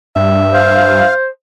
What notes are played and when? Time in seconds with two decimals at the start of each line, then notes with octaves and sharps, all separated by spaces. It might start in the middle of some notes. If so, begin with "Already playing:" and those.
0.16 G2 E5
0.53 C5 F5